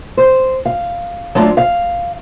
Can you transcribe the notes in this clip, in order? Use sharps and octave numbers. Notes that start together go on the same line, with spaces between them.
C5
F5
F#3 A3 D4 F4
F5